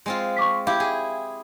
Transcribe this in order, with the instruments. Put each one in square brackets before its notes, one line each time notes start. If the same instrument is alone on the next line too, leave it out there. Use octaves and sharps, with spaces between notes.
[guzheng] G#3 C4 F4
[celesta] C#6 D6 B6
[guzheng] E4 G4 [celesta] F5
[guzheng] G#4